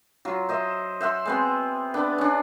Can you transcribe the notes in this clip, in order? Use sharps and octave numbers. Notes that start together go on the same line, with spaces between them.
F#3 F4
C5 D#5 E5
C5 E5 F#5 C6
G#3 B3 C4
B3 D4
C#4 D4